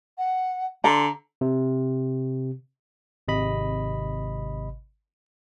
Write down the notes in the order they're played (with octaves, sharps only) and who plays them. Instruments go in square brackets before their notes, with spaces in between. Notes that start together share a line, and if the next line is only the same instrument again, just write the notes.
[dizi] F#5
[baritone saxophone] D3 [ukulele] A#5 [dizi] C6
[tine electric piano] C3
G#1 C3 D#5 B5